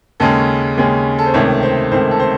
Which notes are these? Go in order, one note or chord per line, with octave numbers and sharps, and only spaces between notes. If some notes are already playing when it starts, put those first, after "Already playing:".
D#2 C#3 G#3 C#4 A4
D#2 C#3 G#3 C#4
A4
C5
C#2 C3 D#3 A3 C#5
C5
C#2 C3 D#3 A3 C5
A4
C5